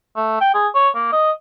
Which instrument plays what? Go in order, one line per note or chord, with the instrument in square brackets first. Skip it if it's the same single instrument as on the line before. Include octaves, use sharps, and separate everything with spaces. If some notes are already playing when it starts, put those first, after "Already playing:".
[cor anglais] A3
G5
G#4
C#5
A#3
D#5